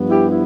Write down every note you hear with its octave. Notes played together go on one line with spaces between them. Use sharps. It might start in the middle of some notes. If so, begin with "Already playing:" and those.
Already playing: G2 F3 B3
E4 G4
E4